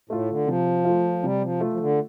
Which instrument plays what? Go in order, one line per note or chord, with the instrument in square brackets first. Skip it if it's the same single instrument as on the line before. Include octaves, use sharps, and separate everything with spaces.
[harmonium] A2 [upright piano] A3 F4
[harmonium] D3
[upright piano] C3 [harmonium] F3
[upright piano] A3 F4
[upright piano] C3 [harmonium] G3
[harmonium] F3
[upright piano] A3 F4
[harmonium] F3
D3